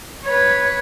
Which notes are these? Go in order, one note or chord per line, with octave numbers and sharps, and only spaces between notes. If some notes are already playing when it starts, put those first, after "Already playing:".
B4 C#5